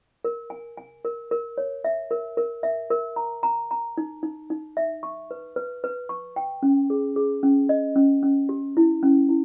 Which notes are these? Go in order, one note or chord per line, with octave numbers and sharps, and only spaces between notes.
A#4
G#5
G#5
A#4
A#4
C#5
E5
A#4
A#4
E5
A#4
A#5
A#5
A#5
D#4
D#4
D#4
E5
C#6
B4
B4
B4
C#6
G5
C#4
G#4
G#4
C#4
D#5
C#4
C#4
G4
E4
C#4
E4